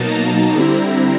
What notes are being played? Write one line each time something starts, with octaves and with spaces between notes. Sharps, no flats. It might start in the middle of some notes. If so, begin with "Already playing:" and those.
Already playing: B2 F#3 A#3 D#4 A5
A#5
D3 G3 C4 E4